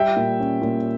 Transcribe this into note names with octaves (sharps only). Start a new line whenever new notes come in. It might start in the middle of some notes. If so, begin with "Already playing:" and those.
Already playing: G3 E5 G5
A#2
C#4
A#2